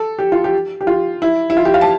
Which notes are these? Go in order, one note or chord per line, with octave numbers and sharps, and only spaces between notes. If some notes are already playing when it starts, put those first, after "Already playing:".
Already playing: A4
G4
F4
G4
G4
F4
E4
E4
F4
G4
F5
A5